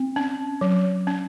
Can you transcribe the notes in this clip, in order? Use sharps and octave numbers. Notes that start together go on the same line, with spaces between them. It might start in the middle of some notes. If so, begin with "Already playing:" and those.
Already playing: C4
C#4
F#3
C#4